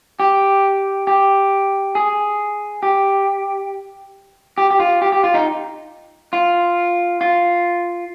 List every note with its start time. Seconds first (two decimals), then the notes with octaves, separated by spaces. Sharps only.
0.20 G4
1.07 G4
1.95 G#4
2.83 G4
4.58 G4
4.71 G4
4.80 F4
5.02 G4
5.12 G4
5.24 F4
5.34 D#4
6.33 F4
7.21 F4